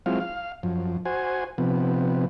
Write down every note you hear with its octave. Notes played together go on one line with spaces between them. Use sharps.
F#3 G#3 C4 E4 F4 F5
F5
F#2 F3
F#4 C5 G#5
C3 F3 B3